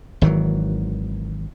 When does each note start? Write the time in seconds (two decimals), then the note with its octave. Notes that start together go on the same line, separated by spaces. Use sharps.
0.22 G#1 D#3 E3 F#3